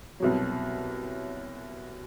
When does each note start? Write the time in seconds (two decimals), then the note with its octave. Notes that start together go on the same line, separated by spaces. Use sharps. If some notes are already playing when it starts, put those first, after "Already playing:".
0.20 C2 B2 F#3